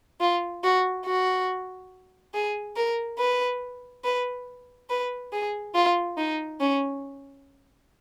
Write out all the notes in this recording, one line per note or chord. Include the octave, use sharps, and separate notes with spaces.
F4
F#4
F#4
G#4
A#4
B4
B4
B4
G#4
F4
D#4
C#4